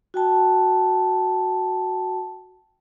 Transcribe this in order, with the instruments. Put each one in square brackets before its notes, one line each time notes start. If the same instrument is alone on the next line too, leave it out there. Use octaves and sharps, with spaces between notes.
[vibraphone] F#4 G5 A5